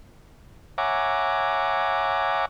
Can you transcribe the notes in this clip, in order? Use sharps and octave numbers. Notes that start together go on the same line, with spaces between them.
C#5 E5 F#5 G#5 A#5 D6